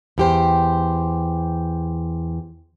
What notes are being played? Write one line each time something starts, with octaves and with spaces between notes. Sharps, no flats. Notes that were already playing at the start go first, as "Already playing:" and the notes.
E2 G4 C5